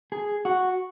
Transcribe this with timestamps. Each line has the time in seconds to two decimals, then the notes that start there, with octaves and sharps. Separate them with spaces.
0.12 G#4
0.45 F#4